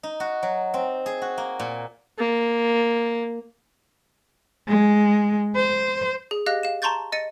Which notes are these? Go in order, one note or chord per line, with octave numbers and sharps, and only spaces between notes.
D#4
F#4
F#3
C4
G#4
F#4
A#3
A#2
A#3
G#3
C5
G#4
G4 D#5 F5 F#6 A#6
F5 E7
A5 A#5 C6 C#6 G6 A6
D#5 A6 C#7 D#7